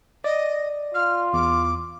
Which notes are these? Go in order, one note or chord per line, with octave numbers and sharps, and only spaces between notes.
D5 D#5
F4 F6
E2 D6